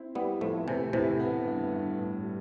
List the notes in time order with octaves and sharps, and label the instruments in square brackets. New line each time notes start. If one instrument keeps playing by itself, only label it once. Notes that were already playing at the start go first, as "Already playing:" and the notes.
Already playing: [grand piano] C4 E4
[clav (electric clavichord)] G3 B3 [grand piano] E4
[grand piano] A2 [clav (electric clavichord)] F3 A3
[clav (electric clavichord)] C3 E3 [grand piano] A3
[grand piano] A2 [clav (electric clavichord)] C3 E3
[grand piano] B3
G2
G2
A2
G3